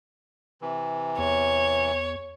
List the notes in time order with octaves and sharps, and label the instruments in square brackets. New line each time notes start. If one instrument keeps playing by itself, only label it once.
[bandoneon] C3 E3
[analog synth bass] E2 [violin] C#5